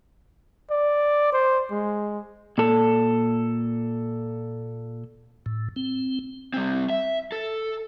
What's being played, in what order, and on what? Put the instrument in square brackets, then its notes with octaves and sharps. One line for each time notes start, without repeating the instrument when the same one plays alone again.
[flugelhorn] D5
C5
G#3
[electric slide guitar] A#2 A4
[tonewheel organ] A2
C4
[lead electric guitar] G3 C4
E5
A4